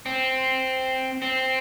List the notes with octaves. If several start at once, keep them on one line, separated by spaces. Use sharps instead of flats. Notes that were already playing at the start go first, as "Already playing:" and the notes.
C4
C4